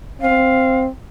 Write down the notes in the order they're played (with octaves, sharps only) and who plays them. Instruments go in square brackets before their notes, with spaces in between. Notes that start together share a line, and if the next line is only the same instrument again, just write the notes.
[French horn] C4 [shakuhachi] F5